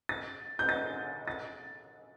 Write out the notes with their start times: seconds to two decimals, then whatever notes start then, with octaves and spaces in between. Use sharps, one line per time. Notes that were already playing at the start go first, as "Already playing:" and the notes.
0.09 A6
0.59 G6
0.69 A6
1.28 A6